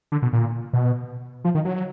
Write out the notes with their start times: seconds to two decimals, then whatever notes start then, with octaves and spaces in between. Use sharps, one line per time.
0.12 D3
0.22 B2
0.33 A#2
0.73 B2
1.45 F3
1.55 D#3
1.65 F#3